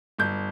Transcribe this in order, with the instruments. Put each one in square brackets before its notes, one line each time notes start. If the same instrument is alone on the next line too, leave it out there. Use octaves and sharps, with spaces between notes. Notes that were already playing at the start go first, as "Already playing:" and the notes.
[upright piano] G1 G6